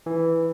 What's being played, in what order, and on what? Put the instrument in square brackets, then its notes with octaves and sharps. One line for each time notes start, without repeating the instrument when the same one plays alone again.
[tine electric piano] E3